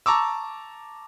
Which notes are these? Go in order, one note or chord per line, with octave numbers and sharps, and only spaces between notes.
A5 A#5 C#6 D6 E6